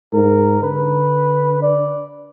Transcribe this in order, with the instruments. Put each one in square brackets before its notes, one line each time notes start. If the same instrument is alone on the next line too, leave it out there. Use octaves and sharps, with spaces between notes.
[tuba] G#2 [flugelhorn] A#4
[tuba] D3 [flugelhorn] B4
[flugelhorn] D5